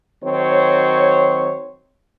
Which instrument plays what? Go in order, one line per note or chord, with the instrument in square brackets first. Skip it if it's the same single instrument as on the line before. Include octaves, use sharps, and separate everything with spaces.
[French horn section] D#3 F#3 C4 C#5